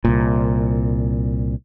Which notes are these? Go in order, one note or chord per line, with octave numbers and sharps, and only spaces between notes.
C2 A#2